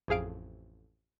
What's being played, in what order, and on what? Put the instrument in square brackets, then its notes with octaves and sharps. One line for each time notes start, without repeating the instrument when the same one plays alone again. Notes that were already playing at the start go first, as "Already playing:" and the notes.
[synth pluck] A1 F2 G#4 F5 D7